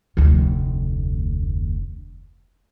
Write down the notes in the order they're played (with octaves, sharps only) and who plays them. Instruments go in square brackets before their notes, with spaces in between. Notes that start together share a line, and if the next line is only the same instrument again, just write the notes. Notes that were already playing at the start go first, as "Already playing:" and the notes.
[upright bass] F1 D2